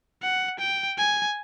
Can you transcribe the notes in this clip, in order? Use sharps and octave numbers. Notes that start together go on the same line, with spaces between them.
F#5
G5
G#5